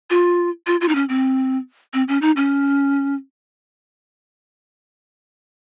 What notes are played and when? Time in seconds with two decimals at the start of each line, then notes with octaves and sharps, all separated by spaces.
0.10 F4
0.67 F4
0.81 F4
0.89 D#4
0.95 C#4
1.09 C4
1.94 C4
2.08 C#4
2.22 D#4
2.36 C#4